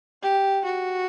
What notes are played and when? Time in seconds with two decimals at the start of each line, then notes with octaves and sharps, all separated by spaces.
0.22 G4
0.65 F#4